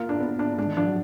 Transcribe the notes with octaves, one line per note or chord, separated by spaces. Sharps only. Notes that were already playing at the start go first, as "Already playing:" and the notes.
Already playing: A#3 F4 A#4
D4
B3
D4
G#3 D4
D#3
F3 D4
F#3